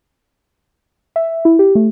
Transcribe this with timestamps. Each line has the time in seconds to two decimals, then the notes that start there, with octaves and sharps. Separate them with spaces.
1.16 E5
1.45 E4
1.59 G4
1.75 A3